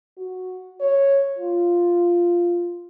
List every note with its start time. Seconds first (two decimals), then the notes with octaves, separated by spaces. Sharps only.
0.17 F#4
0.80 C#5
1.38 F4